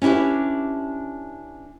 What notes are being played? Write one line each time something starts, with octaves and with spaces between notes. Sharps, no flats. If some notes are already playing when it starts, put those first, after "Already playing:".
C#4 D4 E4 G4 B4